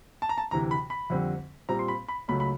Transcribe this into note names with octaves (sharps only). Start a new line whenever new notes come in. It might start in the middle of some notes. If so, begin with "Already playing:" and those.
A5
A#5
A5
D2 C3 E3 A#5
B5
B5
F2 D3 G3 C4
A#2 G3 C4 A#5
C6
B5
B5
C#2 C#3 F#3 A3 B5
B5